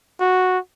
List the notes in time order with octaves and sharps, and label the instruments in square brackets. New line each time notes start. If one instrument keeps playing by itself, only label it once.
[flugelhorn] F#4